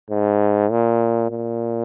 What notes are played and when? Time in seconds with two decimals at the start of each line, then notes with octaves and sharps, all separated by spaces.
0.10 G#2
0.71 A#2
1.30 A#2